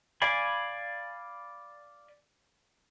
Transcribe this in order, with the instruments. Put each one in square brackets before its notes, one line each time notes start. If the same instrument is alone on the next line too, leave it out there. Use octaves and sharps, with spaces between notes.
[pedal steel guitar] D5 F5 G#5 B5